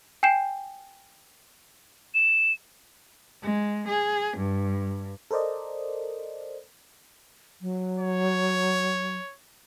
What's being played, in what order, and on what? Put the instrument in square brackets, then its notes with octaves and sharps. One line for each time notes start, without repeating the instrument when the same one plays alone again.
[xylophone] G5 G#5 G6 C7 E7
[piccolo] E7
[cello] G#3
G#4
G2
[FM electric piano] A4 A#4 C5 D5 D#5
[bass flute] F#3
[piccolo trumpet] C#5